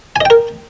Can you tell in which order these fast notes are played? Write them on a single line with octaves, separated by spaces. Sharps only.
G#5 D#5 G5 A#4